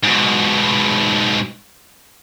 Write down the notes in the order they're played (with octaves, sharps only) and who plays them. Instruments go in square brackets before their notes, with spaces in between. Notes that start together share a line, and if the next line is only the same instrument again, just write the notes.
[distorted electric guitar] G#2 B2